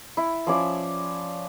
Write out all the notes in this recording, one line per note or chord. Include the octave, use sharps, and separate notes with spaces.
E4
F3 C#4 D5 E5